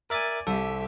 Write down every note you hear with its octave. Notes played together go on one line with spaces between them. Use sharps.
A#4 D5 E5 G#5 A6
C2 G4 A4 C5 E5 D#7